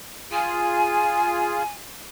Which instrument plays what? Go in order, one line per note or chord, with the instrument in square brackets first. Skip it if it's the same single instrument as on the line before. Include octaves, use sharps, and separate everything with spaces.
[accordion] F4 G#4 [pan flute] G#5